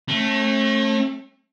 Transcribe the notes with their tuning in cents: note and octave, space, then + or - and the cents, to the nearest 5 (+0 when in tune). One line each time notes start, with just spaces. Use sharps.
A3 +0 C#4 -45